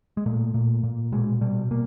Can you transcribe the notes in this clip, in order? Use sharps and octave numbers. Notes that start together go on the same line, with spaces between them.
G#3
A#2 A3
A#2
A#2
B2 G#3
B2 G3
B2 A#3